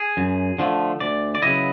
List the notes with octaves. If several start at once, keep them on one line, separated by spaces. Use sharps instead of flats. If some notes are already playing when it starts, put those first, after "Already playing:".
Already playing: G#4
F#2
D3 F3 A3
D2 D5
D5
C#3 F#3 B3 E4 D#5